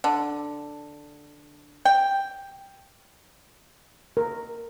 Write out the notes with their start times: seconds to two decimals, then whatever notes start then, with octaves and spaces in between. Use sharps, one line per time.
0.04 D3
1.85 G5
4.17 A#4